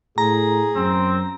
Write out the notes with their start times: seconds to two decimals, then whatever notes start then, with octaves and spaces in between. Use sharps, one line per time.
0.18 A2 G#4 A#5
0.75 F#2 C4